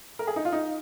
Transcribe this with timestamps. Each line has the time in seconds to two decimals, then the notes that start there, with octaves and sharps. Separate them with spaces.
0.19 A#4
0.27 G#4
0.36 D#4
0.45 F4
0.52 D#4